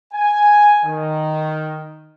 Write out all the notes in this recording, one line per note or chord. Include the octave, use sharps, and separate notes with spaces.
G#5
D#3